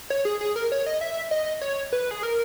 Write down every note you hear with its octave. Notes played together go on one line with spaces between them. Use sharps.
C#5
G#4
G#4
A#4
C#5
D#5
E5
D#5
C#5
B4
G#4
A#4